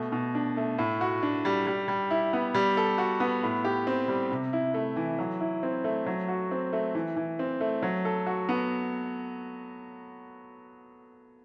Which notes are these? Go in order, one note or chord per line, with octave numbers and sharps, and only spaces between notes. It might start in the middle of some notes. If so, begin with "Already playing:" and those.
Already playing: B2 A3
B2
D4
A3
A2
F#4
D4
G3
G3
G3
E4
B3
G3
A4
F#4
B3
A2
G4
C4
G3
C3
E4
A3
E3
F#3
E4
C4
A3
F#3
F#4
C4
A3
E3
E3
C4
A3
F#3
A4
F#4
B3